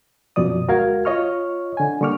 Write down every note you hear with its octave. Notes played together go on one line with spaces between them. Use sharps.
F#2 B2 F3 D5 D#6
D2 G#3 F#4 A#4 F5 G#6
F4 C#5 D#5 C#6 F6
D3 G#5
D3 G3 A#3 C#6 D6 F6